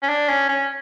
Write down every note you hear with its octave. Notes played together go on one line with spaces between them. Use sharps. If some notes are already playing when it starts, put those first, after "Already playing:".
C#4
D4
C#4
C#4